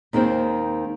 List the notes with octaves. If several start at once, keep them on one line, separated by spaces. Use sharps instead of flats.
D#2 D#3 G#3 C4